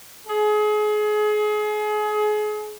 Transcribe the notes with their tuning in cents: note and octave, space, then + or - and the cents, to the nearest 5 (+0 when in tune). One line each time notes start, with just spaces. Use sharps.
G#4 +30